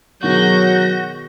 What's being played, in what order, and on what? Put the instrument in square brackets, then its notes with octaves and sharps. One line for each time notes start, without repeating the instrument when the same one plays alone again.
[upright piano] B2 D#3 G#4 [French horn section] F#3 [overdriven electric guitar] F#4 [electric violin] G6 A#6